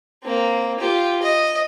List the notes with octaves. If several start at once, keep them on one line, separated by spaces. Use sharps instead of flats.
A#3 C4
F4 G4
D#5